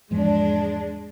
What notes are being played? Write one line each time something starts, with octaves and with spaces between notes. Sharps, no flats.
E2 G#2 F3 G#3 D4